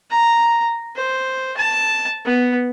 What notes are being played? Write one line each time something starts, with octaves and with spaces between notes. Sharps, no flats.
A#5
C5
A5
B3